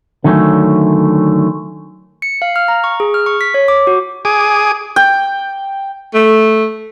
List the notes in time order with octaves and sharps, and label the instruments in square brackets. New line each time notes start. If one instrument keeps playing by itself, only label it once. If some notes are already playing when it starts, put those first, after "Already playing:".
[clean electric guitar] D3 D#3 F#3 A3 C#4
[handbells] C#7
F5
F6
A#5
C#6
G#4
F6
C#6
B6
C#5
D6
F#4
[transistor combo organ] G#4 D6 D#6
[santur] G5
[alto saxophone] A3